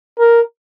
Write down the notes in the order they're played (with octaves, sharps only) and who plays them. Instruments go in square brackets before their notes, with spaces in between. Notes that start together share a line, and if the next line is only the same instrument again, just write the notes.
[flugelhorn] A#4